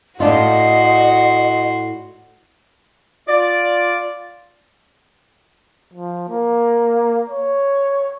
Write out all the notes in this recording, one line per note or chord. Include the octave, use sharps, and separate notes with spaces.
A2 D4 F4 F#4 D#5 C6
F4 D5
F3
A#3
C#5